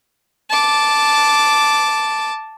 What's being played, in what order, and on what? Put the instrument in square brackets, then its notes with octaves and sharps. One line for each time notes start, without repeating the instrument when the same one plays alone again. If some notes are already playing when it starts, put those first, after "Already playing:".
[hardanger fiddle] A5 D6